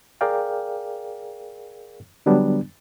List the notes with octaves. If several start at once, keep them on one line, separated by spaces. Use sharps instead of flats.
G#4 A#4 D5 F5 G5
D3 F#3 G3 B3 D4